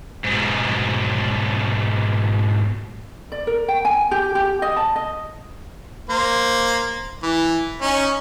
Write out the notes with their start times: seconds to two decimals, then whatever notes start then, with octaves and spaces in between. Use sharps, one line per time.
0.24 G#2 B2
3.32 D5
3.47 A#4
3.68 G5
3.85 G#5
4.11 G4
4.35 G4
4.62 D#5
4.76 A5
4.96 D#5
6.10 A#3 C5
7.23 E3
7.82 C#4 D#4